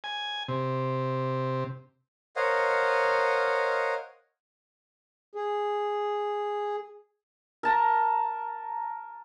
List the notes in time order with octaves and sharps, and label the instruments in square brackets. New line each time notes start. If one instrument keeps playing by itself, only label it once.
[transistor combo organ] G#5
C3
[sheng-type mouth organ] A#4 C5 C#5 D#5 F5 F#5
[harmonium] G#4
[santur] A#4 A5 A#5